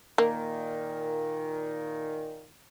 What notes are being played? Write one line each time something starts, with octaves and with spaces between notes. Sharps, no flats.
A#2 D#3 A#3